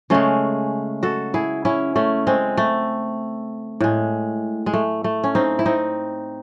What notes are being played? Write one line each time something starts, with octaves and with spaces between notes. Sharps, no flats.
C#3 G#3 A3 C#4
F#4 A4
E4 G#4
C#4 E4
A3 C#4
G#3 C4
A3
A2 G#3
G#3
A3
A3
C#4
C4 D#4
E4
C4 D#4